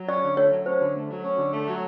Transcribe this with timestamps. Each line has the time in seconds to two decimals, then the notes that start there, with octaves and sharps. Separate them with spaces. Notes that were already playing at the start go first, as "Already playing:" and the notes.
Already playing: F#3
0.09 C#4 D5
0.22 D3
0.37 A3 C#5
0.52 F#3
0.66 C#4 C5
0.80 D3
0.96 A3
1.10 F#3
1.24 C#4
1.38 D3
1.53 A3
1.67 F#3